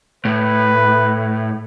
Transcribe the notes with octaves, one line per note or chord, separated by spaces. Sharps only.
A2 B4